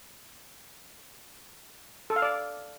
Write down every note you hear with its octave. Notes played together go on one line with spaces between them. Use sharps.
A4
F5
D5